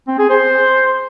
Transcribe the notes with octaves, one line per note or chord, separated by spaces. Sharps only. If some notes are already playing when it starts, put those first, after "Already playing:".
C4
G#4
C5